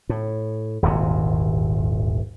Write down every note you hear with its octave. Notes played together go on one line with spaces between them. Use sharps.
A2
D#1 G#1 E2 C3